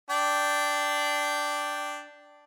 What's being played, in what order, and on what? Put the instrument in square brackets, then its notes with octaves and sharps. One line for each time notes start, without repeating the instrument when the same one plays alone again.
[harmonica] D4 D5 G5